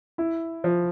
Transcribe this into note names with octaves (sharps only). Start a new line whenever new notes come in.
E4
F3